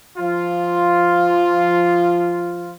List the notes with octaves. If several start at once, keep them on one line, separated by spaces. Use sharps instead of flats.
F3 F4